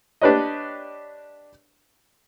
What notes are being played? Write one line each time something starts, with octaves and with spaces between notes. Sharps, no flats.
D4 G4 B4 C#5 D#5